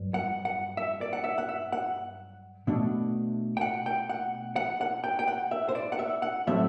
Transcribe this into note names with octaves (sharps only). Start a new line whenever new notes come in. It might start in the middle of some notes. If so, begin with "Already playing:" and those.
Already playing: G2 F#3
F#5
F#5
E5
D5
F#5
E5
F#5
E5
F#5
B2 A3 D4
G5
F#5
G5
F#5
F#5
F#5
G5
G5
F#5
E5
C5
D5
F#5
E5
F#5
A2 F#3 A3 C4 E5